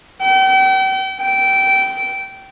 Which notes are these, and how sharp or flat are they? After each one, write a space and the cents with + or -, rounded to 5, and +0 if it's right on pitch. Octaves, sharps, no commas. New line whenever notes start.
G5 -40
G5 -20